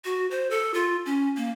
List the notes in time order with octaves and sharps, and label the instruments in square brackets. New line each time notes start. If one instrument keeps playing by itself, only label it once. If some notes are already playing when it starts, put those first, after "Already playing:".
[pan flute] F#4
C5
A4
F4
C#4
A#3